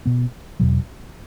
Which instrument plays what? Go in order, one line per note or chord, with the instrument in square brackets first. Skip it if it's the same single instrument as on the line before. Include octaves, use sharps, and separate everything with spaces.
[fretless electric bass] B2 B3
E2 B2 F#3